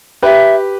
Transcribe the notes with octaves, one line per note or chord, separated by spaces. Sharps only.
G4 B4 E5